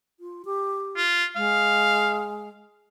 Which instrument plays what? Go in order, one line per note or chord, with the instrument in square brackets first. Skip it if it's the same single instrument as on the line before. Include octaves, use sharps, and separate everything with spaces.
[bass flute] F4
G4
[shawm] F4
[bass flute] G#3 [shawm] F5